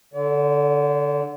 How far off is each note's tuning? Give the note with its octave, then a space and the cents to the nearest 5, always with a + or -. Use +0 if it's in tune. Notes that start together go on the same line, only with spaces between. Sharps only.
D3 +0 D5 -45